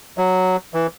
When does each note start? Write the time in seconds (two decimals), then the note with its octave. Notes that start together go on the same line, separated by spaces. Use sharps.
0.18 F#3
0.74 E3